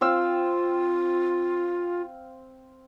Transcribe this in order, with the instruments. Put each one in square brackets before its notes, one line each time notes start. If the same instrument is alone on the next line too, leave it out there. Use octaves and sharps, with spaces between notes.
[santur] C4 F5 E6 [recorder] F4